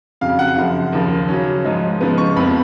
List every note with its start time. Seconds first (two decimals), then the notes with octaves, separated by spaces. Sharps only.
0.21 F2 C#3 F#3 F5
0.39 F#5
0.56 F#2 C#3 F3
0.93 D#2 C#3 F3
1.28 C#3 F#3 C#4
1.64 G#2 F3 G#3 D#4
2.01 C#3 F3 G#3 B3
2.18 C#6
2.36 F2 F3 B3 B5